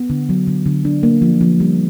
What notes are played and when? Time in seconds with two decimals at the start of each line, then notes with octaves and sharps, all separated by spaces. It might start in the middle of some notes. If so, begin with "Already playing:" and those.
Already playing: B3
0.10 D3
0.29 F#3
0.47 D3
0.66 D3
0.85 D4
1.03 A#3
1.22 F3
1.41 F3
1.60 G3